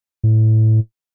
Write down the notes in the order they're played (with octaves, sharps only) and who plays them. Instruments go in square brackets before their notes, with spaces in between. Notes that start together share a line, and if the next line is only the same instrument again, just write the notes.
[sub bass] A2